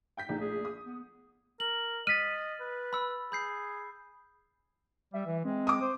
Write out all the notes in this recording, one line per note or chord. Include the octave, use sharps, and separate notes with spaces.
G5 G6 B6
A#1 A3 D#4
G#4
D#6
B3
A#4 F#7
D#5 F6 A6 B6 D#7
B4
B5 E6
G#4 B5 G6 C7
G3 E5
E3
G#3 C4
D6 D#6
C5